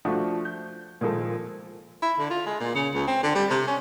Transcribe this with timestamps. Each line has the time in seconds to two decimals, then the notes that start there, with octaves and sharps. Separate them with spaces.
0.05 F3 A3 D4 F#4
0.45 G6
1.01 A#2 D#3 F3 G#3 A4
2.03 E4
2.19 D3
2.30 F4
2.46 G#3
2.60 A#2
2.75 C#3
2.95 C#2
3.08 C4
3.23 D3
3.35 G3
3.50 C3
3.67 C#4